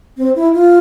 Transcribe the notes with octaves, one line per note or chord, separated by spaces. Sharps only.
C4
E4
F4